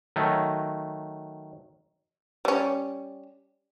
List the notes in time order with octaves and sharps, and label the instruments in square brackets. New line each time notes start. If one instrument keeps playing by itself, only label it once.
[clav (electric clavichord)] D#3 F#3 A3
[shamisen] G3 C#4